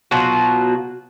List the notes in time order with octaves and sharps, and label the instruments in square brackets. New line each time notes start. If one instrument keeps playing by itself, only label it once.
[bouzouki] B2 F#3 F4 F#4